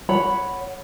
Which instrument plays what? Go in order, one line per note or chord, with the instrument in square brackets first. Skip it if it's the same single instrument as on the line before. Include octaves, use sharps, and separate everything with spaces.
[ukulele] C#5 F#5 B5